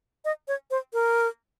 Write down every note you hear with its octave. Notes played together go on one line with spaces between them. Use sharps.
D#5
C#5
C5
A#4